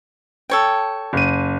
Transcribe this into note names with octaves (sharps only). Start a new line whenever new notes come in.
A4 C#5 G5
F#1 D#7